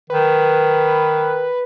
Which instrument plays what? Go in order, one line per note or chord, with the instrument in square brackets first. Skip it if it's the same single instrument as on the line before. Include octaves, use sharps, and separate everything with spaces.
[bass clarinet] D#3 [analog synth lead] B4